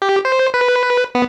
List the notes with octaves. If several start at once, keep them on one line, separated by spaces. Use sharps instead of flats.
G4
C5
B4
B3